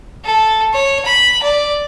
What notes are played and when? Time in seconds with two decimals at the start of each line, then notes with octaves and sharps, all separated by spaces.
0.25 A4
0.73 C#5
1.05 B5
1.43 D5